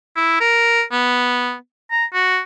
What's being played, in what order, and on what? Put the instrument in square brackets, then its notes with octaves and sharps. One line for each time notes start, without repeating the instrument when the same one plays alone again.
[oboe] E4
A#4
B3
A#5
F#4